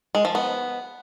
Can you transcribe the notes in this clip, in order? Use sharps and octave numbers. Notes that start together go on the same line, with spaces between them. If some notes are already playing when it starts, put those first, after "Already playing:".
G#3
F3
B3